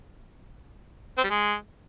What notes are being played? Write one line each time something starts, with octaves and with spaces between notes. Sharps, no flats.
C4
G3
G#3